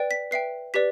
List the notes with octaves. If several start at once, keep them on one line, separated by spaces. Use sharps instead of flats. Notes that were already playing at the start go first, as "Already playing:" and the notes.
Already playing: B4 D5 G5
B6
B4 E5 G5 C7
G4 B4 D5 B6